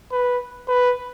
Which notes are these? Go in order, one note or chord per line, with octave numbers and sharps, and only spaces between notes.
B4
B4